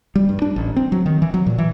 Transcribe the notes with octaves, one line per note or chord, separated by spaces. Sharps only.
G3
G2
D4
A1
C4
F#3
D#3
E3
F#3
A#2
E3